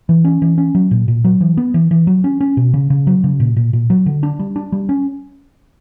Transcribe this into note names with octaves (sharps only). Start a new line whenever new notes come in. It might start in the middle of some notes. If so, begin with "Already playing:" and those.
E3
C#4
E3
C#4
F#3
A#2
A#2
F#3
E3
B3
E3
E3
F#3
C#4
C#4
B2
C#3
C#3
F#3
C#3
A#2
A#2
A#2
F#3
D3
D4
G3
D4
G3
C#4